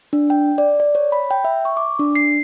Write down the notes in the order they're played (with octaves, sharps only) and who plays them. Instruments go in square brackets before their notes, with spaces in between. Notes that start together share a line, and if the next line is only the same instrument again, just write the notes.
[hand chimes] D4
G5
D5
D5
C#5
B5
G5
E5
C#6
D6
D4
C7